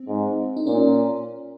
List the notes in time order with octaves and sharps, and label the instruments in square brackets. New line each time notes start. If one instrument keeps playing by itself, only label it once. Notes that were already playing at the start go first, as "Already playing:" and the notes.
Already playing: [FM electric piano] C4
[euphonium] G#2
[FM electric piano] D#4
[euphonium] A#2 [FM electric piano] C#4